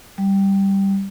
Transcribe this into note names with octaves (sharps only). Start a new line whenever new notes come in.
G3